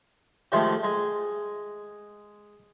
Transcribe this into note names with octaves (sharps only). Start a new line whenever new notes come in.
C3 D#3 F3 G#3 A3
G#3